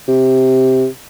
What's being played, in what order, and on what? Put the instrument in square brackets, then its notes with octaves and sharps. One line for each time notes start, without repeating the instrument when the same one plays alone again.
[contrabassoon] C3